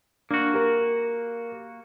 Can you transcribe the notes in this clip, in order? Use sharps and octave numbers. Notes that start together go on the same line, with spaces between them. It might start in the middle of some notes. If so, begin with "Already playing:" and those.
A#3 D4 F#4
G4 A#4